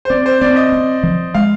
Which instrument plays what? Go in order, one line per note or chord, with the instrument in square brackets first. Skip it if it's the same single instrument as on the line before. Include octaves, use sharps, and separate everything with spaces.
[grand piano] C5
[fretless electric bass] C4 [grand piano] D5
[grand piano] C5
[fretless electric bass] C4 [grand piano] D5
[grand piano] D#5
[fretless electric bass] C4
F3
[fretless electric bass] G#3 [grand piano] F5